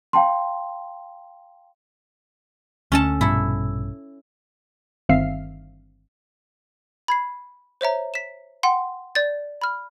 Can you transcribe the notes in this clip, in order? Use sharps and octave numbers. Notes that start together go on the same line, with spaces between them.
F5 G5 A5 C6
D2 C#4 A4 A5
A#1 G2 B2 E4 A4
G1 D#3 C4 E5 F5 C7
B5 G#6 C7
C5 C#5 E5 A#5
B6 E7
F#5 G5 C6
D5 G6 A6
B5 F6